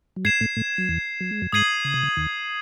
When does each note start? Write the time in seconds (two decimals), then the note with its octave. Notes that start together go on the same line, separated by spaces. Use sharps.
0.16 F#3
0.25 G#2 G#3 G#6 C7 E7
0.41 A2 A3
0.57 A2 A3
0.78 F#3
0.89 E2 E3
1.21 F#3
1.31 G#3
1.42 F#2 F#3
1.52 G#2 G#3 D#6 G#6 C7 D#7 F#7
1.85 C#3
1.94 C3
2.03 C#3
2.17 D#2 D#3